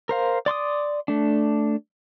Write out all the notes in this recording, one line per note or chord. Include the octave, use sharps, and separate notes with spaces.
A#4 C5 F5
D5 C6 D6 D#6
A3 D4